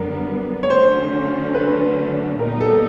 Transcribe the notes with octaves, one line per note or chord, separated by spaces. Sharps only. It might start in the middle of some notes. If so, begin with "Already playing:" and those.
Already playing: F#2 D3 G3 B3 A#4
C#5
D3 F#3 A3 C#4 C5
B4
A#2 G3 B3 D#4 A#4
A4